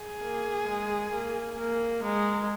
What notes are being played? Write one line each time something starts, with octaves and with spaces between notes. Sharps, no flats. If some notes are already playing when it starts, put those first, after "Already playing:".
Already playing: G#4
A#3
G#3
A#3
A#3
G#3 A#4